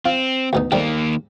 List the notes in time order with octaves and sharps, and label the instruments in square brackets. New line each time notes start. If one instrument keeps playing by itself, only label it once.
[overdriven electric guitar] C4 [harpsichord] F4
[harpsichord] D2 B2 D#4
[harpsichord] C3 G3 A4 [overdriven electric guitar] D#3 A#3